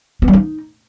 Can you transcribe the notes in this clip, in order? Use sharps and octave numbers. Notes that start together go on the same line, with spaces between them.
B3
G3
D#4